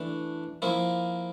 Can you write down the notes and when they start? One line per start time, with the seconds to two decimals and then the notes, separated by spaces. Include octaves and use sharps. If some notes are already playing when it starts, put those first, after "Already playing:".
Already playing: E3 A3 D4
0.62 F3 A#3 E4